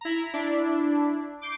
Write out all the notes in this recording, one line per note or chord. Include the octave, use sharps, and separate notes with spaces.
E4 A#5
D4 E4
D6 G6 C7